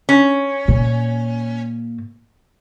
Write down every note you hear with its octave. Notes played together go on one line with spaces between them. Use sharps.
C#4
A#2